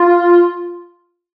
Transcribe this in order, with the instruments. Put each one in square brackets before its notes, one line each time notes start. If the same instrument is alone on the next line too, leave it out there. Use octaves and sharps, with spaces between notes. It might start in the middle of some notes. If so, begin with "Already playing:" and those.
Already playing: [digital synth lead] F4